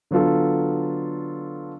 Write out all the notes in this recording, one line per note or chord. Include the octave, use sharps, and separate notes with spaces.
D3 F#3 B3 F4 A4